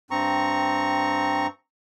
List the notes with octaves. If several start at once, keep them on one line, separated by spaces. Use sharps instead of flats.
G2 C4 A#5 C#6